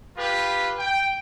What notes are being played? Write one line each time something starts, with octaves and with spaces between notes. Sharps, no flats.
F4 G4 B4
G5